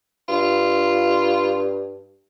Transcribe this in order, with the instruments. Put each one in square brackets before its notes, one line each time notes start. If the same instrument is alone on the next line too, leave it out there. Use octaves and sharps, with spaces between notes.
[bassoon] G2 [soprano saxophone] F4